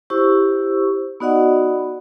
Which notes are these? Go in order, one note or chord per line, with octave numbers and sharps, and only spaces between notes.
E4 G4 C5 C#6 E6
B3 D#4 F#4 D5 D#5 F#5